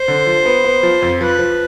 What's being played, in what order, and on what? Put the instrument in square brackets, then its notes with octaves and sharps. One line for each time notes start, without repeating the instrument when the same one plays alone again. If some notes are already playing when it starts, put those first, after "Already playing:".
Already playing: [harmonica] C5
[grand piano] D3
F3
B3
B3
F3
F2
[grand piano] F3 [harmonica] B4
[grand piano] F3